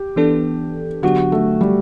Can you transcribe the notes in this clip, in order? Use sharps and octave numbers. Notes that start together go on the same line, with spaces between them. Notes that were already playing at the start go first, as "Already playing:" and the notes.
Already playing: G4
E3 B3 D4 A4
D3 F#3 B3 D4 F#4 G4
A3
G3